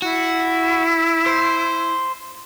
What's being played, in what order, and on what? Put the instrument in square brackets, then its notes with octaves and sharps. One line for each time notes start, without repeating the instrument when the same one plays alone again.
[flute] E4 [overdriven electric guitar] F#4
[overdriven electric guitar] C5